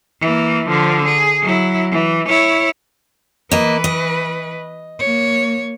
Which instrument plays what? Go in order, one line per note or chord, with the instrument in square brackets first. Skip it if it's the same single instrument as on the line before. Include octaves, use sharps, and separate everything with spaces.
[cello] E3 A#3
D3 F3
G#4
F#3 E4
E3
E4 C#5
[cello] E3 B4 [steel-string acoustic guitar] A#3 D#5
[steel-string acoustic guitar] D#5
[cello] A#3 C#5